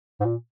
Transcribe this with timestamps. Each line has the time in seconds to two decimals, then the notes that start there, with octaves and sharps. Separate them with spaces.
0.20 G#2
0.25 A#2